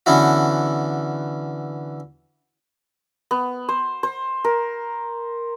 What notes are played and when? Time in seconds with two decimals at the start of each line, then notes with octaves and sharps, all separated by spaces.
0.06 D3 E3 B3 C#4 E4 F#4
3.31 B3
3.69 C5
4.03 C5
4.44 A#4